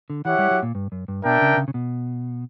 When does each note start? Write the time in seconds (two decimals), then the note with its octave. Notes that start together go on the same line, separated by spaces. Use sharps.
0.10 D3
0.25 E3 E4 G4 C#5 F#5
0.39 G3
0.51 F#3
0.63 A#2
0.75 G2
0.92 F#2
1.08 G2
1.24 B2 D4 A#4 E5 G5
1.42 C#3
1.57 C#3
1.68 C#3
1.74 B2